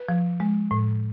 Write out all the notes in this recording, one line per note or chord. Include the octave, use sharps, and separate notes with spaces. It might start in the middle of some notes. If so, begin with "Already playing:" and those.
Already playing: B4
F3
G#3
A2